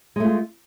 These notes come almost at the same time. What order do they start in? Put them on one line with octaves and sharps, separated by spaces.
G#3 A3 F4